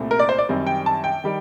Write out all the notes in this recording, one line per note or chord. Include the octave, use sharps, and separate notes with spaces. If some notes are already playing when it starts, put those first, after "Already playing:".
Already playing: C2 A#2 A3 C4
A#4
D5
C5
D5
F#2 D#3 G3 C4
G5
A5
G5
D#3 G3